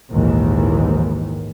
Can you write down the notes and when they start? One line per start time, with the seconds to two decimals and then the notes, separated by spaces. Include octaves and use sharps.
0.11 A#1 D#2 G#2 D#3 E3